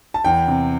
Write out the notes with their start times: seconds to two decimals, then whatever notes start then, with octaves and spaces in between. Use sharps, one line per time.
0.14 A5
0.25 E2 G5
0.48 C3